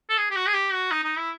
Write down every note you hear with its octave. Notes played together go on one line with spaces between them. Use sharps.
A4
G#4
G4
F#4
G#4
G4
F#4
D#4
D#4
E4